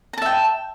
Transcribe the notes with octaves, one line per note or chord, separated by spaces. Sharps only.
E5 G5 A5 A#5